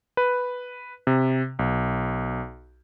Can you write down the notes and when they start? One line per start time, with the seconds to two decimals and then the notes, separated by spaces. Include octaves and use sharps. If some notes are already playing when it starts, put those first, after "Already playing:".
0.17 B4
1.07 C3
1.59 B1